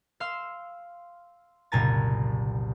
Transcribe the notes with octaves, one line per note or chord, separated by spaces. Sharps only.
F5 C6 E6
F#1 C2 A#2 G#5 A#5 A6